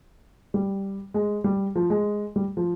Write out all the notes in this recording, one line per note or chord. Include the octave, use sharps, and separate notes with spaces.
G3
G#3
G3
F3
G#3
G3
F3